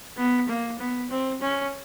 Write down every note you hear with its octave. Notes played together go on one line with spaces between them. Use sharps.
B3
A#3
B3
C4
C#4